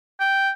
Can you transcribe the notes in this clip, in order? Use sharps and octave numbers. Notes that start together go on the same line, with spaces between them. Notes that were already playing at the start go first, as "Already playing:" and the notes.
G5